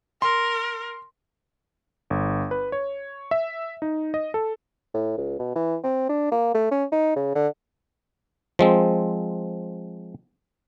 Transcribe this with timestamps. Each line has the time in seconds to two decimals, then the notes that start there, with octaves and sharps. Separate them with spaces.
0.22 A#4 C6
2.10 G1
2.51 B4
2.72 C#5
3.31 E5
3.82 D#4
4.14 D#5
4.34 A4
4.94 A2
5.18 C#2
5.39 B2
5.56 E3
5.84 C4
6.09 D4
6.32 A#3
6.54 A3
6.71 C#4
6.92 D#4
7.16 C#3
7.35 D3
8.59 F3 G#3 C4